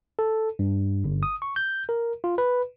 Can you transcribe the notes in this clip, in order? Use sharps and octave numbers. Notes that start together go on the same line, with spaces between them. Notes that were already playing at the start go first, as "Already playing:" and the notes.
A4
G2
G1
D#6
C#6
G6
A#4
F4
B4